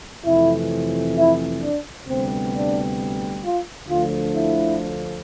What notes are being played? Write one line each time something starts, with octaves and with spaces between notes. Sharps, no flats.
F2 C3 E3 A3 E4
E4
D4
D2 C3 G3 B3 C4
D4
F4
D2 D3 F3 A3 F4
E4